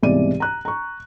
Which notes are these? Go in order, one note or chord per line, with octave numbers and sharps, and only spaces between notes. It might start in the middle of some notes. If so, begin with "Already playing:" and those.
C2 G#2 B2 E3 D5 D#7
A#5 F#6
A#5 C#6